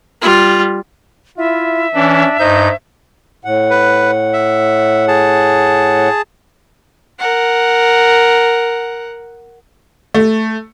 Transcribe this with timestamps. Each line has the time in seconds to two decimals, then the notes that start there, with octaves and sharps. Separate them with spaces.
0.22 G3 F4
1.38 E4 F4 E5
1.94 E3 C#4 D4
2.39 G2 D#4 C5 G6
3.45 A2 F#5
3.70 B4
4.33 E5
5.08 G#4 A5
7.19 A#4 F#5
10.14 A3